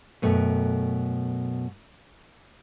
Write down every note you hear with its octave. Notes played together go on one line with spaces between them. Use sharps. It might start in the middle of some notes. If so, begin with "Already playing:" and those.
F#2 B2 A3 G5